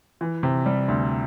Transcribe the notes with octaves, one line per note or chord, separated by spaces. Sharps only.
E3
C3
G3
D2